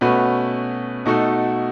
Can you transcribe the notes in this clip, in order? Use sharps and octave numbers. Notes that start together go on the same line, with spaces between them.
B2 A3 C#4 F#4 B4
B2 A3 D#4 F#4 A4